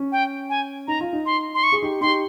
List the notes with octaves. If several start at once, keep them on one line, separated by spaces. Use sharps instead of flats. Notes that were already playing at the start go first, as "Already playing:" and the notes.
Already playing: C#4
G5
G#5
D#4 A#5
F4
D#4
C6
C6
C#6
G#4
D#4 G4
D#4 G4 C6